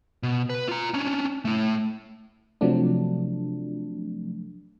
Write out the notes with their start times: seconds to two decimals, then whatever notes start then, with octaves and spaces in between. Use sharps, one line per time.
0.23 B2
0.50 B4
0.68 F4 A#5
0.94 C#4 D4
1.45 A3 E4
2.61 C3 F3 F#3 A3 D4